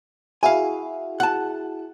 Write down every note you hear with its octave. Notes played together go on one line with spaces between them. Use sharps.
E4 F#4 G#4 F5 G#5
F#5 A5